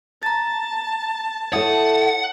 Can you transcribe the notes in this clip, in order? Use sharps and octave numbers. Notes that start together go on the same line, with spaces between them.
A5 A#5 A6
E4 A4 C#5 F#5 D#6